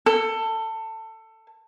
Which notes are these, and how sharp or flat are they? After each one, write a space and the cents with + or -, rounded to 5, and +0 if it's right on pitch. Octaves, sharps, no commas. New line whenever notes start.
A4 +20